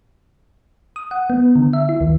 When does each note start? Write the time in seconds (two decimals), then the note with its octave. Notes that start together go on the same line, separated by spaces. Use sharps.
0.96 D#6
1.11 F#5
1.30 B3
1.56 D3
1.73 E5
1.89 E4
2.01 D#2